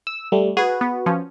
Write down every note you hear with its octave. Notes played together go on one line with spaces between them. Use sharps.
E6
G3 A3
F#4 G#4 B4
B3
F3 C#4